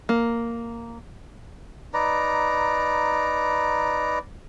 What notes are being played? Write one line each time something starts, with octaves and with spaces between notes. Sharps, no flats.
A#3
D#4 B4 D5 A#5